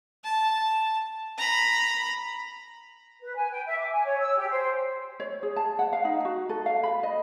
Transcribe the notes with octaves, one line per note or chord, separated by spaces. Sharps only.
A5
A#5 B5
B4
G#5
G5
E5
D6
G#5
C#5
E6
G4
C5
C#5
G#4
A5
F#5
F5
D#4
F#4
A4
F5
B5
D#5